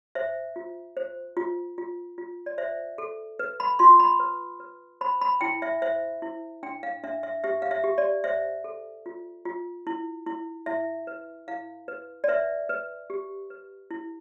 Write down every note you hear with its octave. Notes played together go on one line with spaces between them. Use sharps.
C5 E5
F4
C5
F4
F4
F4
D5
C5 E5
A4
B4
B5
F4 C6
B5
B4
B4
C5 B5
B5
E4 G5
E5
C5 E5
E4
D4 G5
F5
D4 E5
E5
G4 E5
F5
E5
G4
D5
C5 E5
A4
F4
F4
E4
E4
E4 E5
B4
E4 F5
B4
D5
B4 E5
B4
G4
B4
E4